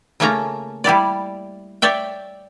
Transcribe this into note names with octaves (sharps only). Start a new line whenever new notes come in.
C#3 A3 A#3 C#4 F4 A#5
G3 E4 G4 D5
C#5 D5 E5 G5